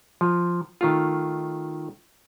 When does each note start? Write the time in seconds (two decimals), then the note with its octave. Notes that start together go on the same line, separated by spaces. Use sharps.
0.21 F3
0.81 D#3 A3 F4